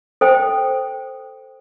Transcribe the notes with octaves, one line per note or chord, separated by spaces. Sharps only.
A4 C5 G5